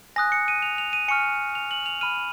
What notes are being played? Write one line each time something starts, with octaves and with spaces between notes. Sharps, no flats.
G#5 D#6 F#6 A#6
C#7
D#7
F7
F7
D#7
G#5 C#6 F6 C#7
F7
F#7
F7
B5 F6 D#7